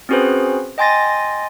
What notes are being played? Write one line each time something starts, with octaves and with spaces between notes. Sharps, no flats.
C4 C#4 F#4 G#4 B4 C5
D#5 G5 G#5 C6 A6 A#6